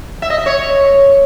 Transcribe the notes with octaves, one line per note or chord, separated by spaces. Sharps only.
E5
D#5
E5
C#5